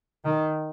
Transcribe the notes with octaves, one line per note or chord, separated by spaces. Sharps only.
D#3